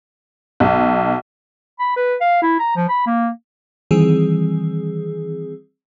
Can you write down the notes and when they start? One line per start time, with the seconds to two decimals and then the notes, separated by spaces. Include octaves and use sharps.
0.60 B1
1.80 B5
1.97 B4
2.21 F5
2.42 E4
2.59 A#5
2.76 F3
2.89 B5
3.07 A#3
3.91 D#3 E3 G3 C4 G#4